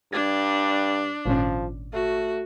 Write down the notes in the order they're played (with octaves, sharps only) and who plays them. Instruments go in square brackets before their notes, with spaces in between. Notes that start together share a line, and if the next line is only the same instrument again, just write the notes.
[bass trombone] G2 [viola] D4 [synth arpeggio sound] G#6 A6
[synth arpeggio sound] G#1 A#2 C#4 [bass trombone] F3
[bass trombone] A3 [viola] F#4